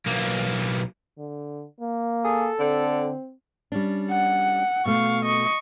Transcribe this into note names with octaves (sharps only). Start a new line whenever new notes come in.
B1 A#3
D3
A#3
G#4 A4
D3 C4
G3 C#4 D4
F#5
B2 A3 F5 C#6
D#5 C#6